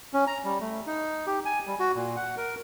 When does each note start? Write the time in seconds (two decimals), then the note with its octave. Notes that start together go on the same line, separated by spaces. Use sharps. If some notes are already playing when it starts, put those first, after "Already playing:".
0.14 C#4
0.27 A#5
0.45 G3
0.61 A3
0.87 D#4
1.27 G4
1.45 G#5
1.67 G3
1.80 F#4
1.95 A#2
2.16 F#5
2.37 A#4